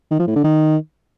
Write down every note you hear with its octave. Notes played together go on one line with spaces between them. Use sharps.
D#3
F3
A2
D3
D#3